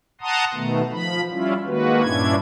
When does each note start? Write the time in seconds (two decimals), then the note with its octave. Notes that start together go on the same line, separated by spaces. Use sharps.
0.21 F#5 A5 A#5 C6 D#6
0.54 B2 D#3 A3 B3
0.91 F3 B5
1.31 G3 C#4 E4 F4
1.66 D#3 G#3 A#3 F#4 B4
2.02 G2 A#2 C#4 D4 E4 G#6